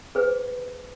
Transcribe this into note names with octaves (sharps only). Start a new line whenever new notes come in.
G#4 B4 C5